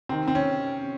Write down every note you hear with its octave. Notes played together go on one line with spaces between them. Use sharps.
C3 D#3 C4
C4
C#4